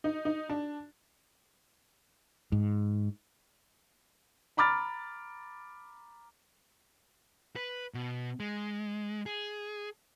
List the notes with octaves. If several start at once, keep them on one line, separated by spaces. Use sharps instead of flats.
D#4
D#4
D4
G#2
A#5 B5 D6 F6 A6
B4
B2
G#3
G#4